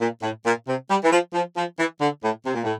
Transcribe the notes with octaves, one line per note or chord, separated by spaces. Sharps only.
A#2
A2
A#2
C3
G3
E3
F3
F3
F3
E3
D3
A2
C3
A#2
A2